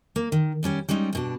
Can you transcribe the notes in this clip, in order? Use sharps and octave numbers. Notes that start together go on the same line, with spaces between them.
A#3
D#3
D#2 G3 C#4 G4
G3 G#3 C#4 D#4
G2 B2 D4